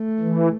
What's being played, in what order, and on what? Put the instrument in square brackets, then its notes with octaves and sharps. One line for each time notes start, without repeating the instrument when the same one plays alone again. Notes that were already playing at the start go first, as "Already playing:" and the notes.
Already playing: [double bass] A3
[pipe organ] E3